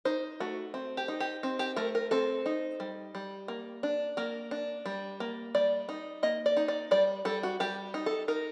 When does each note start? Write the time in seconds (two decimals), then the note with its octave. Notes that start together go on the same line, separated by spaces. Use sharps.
0.05 D#4 C5
0.40 A3 F#4
0.74 C4
0.97 G4
1.08 D#4
1.20 G4
1.43 C4
1.59 G4
1.76 A3 A#4
1.95 A#4
2.11 C4 A4
2.46 D#4
2.80 G3
3.15 G3
3.48 A#3
3.83 D4
4.17 A#3 A#4
4.51 D4
4.86 G3
5.20 A#3
5.55 G3 D5
5.89 D#4
6.23 A#3 D#5
6.46 D5
6.57 D#4
6.68 D5
6.91 G3 D5
7.25 G3 A4
7.43 F#4
7.60 G3 G4
7.94 D#4
8.06 A4
8.28 D#4 A#4